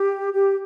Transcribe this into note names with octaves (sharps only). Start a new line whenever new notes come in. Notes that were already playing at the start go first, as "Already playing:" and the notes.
Already playing: G4
G4